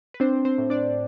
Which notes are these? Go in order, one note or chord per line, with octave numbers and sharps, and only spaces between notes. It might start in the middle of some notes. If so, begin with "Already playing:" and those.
B4
C4 D4 C5
C4 C5
A2
D4 D5